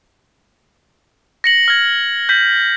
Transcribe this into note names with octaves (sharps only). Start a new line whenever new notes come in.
A#6 C#7 F#7
F6 G#6
G6 B6 F#7